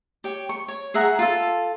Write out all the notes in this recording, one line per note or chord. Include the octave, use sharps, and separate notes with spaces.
G4 C#5
C#6
C#5
G#4 E5 F#5 A#5
F4 A4